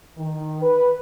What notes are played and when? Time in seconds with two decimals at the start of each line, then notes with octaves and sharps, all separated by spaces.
0.17 D#3
0.61 B4